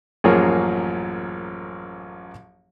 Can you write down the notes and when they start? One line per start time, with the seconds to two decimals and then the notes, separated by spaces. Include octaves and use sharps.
0.24 A1 F#2 F3 A#3 G#4 C#5